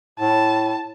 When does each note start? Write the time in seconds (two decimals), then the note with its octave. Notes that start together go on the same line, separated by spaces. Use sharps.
0.19 A2 A5